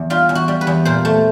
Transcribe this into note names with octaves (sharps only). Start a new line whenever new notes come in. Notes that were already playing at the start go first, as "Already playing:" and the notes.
Already playing: E2
G3 F4
E2
F#4
G3
B4
E2
A#2 C5
A3